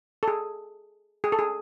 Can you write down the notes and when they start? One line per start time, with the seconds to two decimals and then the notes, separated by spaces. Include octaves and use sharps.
0.23 A4
0.28 G#4
1.24 G#4
1.32 A4
1.39 G#4